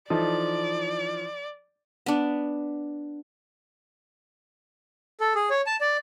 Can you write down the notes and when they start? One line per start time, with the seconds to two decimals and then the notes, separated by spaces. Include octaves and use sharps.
0.10 E3 F3 D#4 A4 D5
2.06 B3 D4
5.20 A4
5.35 G#4
5.50 C#5
5.67 A5
5.81 D5